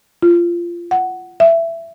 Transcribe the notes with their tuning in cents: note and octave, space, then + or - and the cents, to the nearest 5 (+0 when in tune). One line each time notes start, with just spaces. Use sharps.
F4 -20
F#5 +5
E5 +15